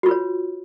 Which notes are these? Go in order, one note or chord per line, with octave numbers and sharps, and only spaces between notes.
F4 F#4 B4 C#5